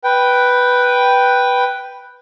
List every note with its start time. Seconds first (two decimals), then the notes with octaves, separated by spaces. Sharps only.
0.04 B4 G5